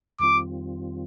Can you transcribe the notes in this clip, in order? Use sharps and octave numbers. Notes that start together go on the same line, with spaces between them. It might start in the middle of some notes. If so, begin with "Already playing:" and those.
F2 D#3 G3 C4 F4 D6